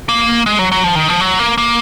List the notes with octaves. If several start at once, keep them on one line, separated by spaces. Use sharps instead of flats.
A#3
G#3
F#3
F#3
F3
D#3
F3
F#3
A#3
A#3